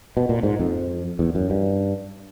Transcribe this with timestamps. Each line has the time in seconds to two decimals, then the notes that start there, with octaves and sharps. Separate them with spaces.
0.17 B2
0.29 A#2
0.43 G#2
0.59 F2
1.19 E2
1.35 F#2
1.50 G2